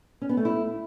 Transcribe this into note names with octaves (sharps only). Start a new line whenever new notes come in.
C#4
B3
A3
E4